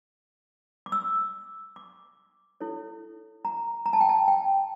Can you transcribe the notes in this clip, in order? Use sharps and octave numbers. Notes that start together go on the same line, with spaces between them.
D6
E6
D6
E4 A4 C#5
A#5
A#5
A5
G5
A5
G5